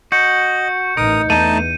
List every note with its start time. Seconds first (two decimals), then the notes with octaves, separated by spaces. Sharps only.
0.12 F#4 D#5 G6 C#7
0.97 A1 D#4 A#4 D#6
1.30 E2 A3 D4 D#4 A5 G6 D#7